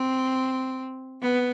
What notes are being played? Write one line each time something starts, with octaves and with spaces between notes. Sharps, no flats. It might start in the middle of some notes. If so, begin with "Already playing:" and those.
Already playing: C4
B3